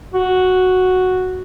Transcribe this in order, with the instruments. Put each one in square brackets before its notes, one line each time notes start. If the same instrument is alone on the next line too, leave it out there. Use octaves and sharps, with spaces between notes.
[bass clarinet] F#4